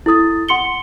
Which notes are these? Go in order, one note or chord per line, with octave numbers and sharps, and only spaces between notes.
E4 A4 D#6 A6
F#5 C6 C#7 G7